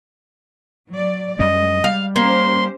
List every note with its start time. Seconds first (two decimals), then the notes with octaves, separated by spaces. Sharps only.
0.91 F#3 D5
1.39 F#2 G3 G#3 C#4 D#5
1.84 G3 F5
2.16 A#3 C#4 G4 C5 C6